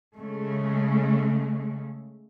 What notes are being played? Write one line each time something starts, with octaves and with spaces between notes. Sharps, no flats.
C#3 G#3 A3